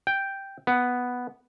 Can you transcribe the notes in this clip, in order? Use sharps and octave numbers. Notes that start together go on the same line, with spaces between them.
G5
B3